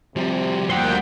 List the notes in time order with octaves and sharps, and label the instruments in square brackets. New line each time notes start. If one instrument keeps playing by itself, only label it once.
[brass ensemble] C3 [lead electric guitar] F3 G3
[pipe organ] D2 A#3 G5 [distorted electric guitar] C5 F#5